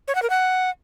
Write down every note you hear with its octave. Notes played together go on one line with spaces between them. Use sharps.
C#5
F#5
A#4
F#5